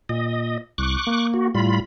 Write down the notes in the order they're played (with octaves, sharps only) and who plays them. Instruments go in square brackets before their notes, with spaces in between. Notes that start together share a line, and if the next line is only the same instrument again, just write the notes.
[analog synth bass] A#2 [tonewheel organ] D#5
[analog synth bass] C2 [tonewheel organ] C#6 D6 F#6
[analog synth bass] A#3
[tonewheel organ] F#4
[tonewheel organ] A2 F4 B5 [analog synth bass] G3